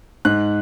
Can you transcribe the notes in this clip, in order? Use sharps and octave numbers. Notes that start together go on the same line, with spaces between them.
G#2 F#6